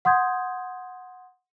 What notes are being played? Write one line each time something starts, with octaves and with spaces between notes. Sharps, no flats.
F#5 C6 D#6 G6 G#6